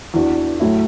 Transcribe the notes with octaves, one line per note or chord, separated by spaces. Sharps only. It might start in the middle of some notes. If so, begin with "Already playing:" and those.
E2 E3 D4 F#4
A2 F#3 A3 E4